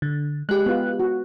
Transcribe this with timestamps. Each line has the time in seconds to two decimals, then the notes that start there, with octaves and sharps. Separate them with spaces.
0.02 D3
0.49 G#3 G4 F#6
0.66 B3 F4
1.00 F#4